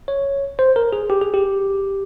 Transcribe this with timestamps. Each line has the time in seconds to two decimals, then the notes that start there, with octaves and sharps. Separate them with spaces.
0.08 C#5
0.59 C5
0.76 A#4
0.93 G#4
1.10 G4
1.21 G#4
1.34 G4